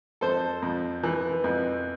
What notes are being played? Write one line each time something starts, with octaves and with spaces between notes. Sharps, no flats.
F2 A4 C5
F2
E3
F2